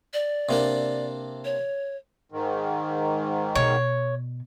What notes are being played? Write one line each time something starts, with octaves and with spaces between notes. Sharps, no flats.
D5
C3 A#3 D4
C#5
G#2 D#3
B2 C#5